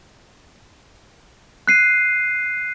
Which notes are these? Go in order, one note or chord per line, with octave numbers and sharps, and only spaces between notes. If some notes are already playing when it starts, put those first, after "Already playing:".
F#6 C7 D#7